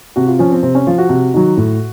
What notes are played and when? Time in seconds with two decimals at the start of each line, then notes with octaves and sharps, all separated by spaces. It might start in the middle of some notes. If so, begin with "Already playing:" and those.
0.16 C3 F#4
0.27 F4
0.39 F3 C#4
0.52 C4
0.63 C3 C4
0.75 C#4
0.87 F3 F4
0.98 F#4
1.09 C3
1.34 D#3 F#3
1.57 A2